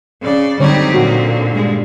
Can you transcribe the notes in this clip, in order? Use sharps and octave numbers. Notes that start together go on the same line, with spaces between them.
C#3 D5
D3 F#3 G3 C4 D#4 G4 C#5
A#2 D3 F#4
G2 G#3